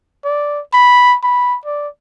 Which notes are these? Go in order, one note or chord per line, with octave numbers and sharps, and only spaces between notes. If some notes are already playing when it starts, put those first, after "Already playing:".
D5
B5
B5
D5